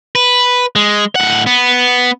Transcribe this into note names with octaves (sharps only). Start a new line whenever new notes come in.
B4
G#3
A2 F#5
B3